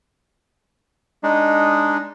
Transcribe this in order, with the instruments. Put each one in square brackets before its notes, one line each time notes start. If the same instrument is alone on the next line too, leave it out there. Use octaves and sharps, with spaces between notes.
[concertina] G#3 D4 D#4